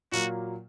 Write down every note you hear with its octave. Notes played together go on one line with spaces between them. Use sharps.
A#2 F#3 A#3 F#4